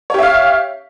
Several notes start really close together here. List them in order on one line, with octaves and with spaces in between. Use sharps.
C#5 G4 E5 F5